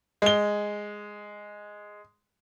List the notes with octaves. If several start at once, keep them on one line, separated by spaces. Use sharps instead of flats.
G#3 G7